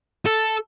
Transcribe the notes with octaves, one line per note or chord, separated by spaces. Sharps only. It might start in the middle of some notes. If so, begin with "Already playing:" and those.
A4